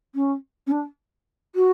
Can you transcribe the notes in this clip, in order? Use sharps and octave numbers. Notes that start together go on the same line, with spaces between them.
C#4
C#4
D4
F#4